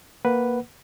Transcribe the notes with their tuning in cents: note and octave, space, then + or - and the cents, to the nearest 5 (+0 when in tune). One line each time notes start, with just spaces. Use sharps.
A#3 +5 B4 +0 F#5 +0